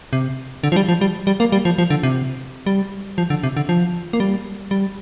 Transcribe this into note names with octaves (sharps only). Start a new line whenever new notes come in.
C3
D3
F3
G3
F3
G3
G3
A#3
G3
F3
F3
D3
C3
G3
F3
D3
C3
D3
F3
A#3
G3
G3